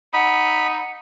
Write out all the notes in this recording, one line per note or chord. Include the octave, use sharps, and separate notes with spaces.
D#4 F#5 B5